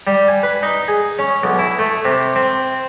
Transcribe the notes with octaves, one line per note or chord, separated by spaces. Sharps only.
G3
G#5
B4
D#4
G#4
C#4
B1
E4
A3
C3
C4